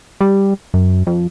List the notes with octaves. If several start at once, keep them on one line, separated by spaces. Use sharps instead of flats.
G3
F#2
F2